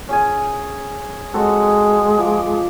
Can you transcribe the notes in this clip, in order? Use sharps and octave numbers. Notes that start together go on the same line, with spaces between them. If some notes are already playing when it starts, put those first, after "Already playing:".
C#4 G#4 G#5
G#3 C4 F#4 A4
F3 D6